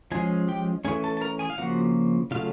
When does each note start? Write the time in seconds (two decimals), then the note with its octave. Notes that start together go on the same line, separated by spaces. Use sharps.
0.12 F3 G#3 C#4 G#4 G#5
0.48 G4 G5
0.85 E3 A3 C#4 G#4 G#5
1.04 A4 A5
1.17 A5
1.21 A#4 A#5
1.39 G#4 G#5
1.50 F5
1.58 C#3 F3 A#3 F#4 F#5
2.31 C#3 F#3 A3 F4 F5